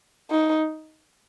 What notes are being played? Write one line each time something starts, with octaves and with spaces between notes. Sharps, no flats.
D#4